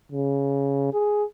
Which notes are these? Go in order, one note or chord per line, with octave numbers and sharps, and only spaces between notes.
C#3
G#4